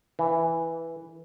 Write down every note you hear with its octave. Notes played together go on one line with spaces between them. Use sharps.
E3